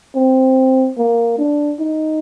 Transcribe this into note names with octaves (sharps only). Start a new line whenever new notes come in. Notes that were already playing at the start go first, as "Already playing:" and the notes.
C4
A#3
D4
D#4